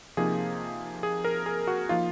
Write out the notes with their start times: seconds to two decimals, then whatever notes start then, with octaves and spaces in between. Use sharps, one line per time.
0.17 C3 F3 A#3 D#4 G#4
1.03 G#4
1.25 A#4
1.46 G#4
1.67 F#4
1.89 F3 A#3 D#4 F4